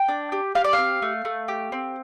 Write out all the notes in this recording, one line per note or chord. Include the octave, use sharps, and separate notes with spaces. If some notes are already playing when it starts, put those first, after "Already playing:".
Already playing: G5
D4
G4
G4 F5
D5
F5
C4
A3
A3
G4
C4